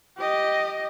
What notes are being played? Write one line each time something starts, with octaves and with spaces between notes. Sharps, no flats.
G4 D#5